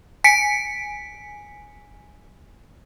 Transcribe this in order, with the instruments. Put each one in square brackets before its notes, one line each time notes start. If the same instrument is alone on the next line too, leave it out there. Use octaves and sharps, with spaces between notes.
[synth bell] G#5 B6 C#7 D7